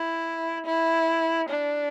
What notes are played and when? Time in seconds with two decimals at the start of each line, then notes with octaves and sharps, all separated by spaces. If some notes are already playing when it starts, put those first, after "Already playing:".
Already playing: E4
0.67 E4
1.50 D4